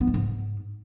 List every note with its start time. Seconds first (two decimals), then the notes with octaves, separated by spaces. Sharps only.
0.01 B3
0.07 E3
0.14 G#2